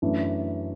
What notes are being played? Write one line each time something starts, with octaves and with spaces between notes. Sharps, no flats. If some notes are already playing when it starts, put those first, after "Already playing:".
F#2 E3 A3 D4